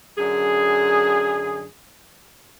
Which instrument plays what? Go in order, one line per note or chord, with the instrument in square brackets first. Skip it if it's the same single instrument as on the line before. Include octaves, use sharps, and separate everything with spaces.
[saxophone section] F#2 D3 G#4